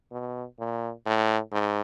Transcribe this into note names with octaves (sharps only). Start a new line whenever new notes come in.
B2
A#2
A2
G#2